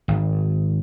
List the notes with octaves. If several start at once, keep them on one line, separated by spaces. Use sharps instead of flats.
G#1